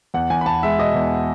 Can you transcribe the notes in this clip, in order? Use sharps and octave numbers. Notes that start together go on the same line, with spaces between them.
E2 F#5
E2 G#5
B5
E2 A5
G#3 E5
B2 D#5
E2